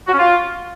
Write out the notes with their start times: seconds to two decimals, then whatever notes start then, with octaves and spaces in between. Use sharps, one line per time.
0.07 F#4
0.13 C#4
0.19 F4